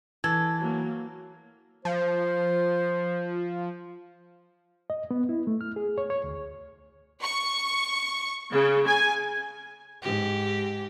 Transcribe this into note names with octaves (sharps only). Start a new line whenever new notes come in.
E3 A4 G#6
F#3 A#3
F3 C5
D#5
B3
E4
A3
F6
G#4
C#5
C#5
D2
C#6
C#3
G#5
G#2 G4